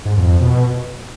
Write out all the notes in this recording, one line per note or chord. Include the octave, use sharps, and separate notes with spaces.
G#2
F2
F2
B2